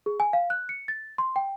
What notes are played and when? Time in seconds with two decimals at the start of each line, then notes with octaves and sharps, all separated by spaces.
0.06 G#4
0.20 G#5
0.33 F5
0.50 F#6
0.69 C#7
0.88 A6
1.18 C6
1.36 G5